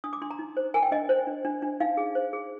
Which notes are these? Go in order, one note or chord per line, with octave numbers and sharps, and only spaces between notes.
D4 D#6
D6
D4 C6
A#5
D#4
C5
A#4 G#5
G5
D4 D#5
C5
D4
D4
D4
D#4 F5
G#4
C5
G#4